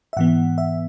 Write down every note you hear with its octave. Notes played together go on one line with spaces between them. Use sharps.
E5
G#2 E3 B3 F#5
E5